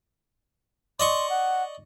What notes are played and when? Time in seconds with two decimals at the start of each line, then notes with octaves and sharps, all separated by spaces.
1.00 D5 D#5 C6 C#6
1.30 F#5